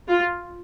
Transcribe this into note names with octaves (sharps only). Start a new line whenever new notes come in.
F4